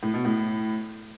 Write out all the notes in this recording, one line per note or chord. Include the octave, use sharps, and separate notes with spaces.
A2
B2
A2